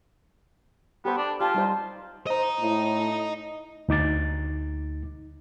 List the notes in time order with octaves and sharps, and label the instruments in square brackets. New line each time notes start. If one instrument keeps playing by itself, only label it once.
[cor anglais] B3 [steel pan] G4 A4 C5
[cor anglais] D4
[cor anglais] F4 [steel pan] G4 [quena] A5
[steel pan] G3 D#4 C5
[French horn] C5 [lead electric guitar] D#5 A#5
[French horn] A2
[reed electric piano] D2 D#4 D6 A6